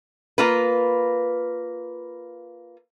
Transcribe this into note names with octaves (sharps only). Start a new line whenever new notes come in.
A#3 F4 B4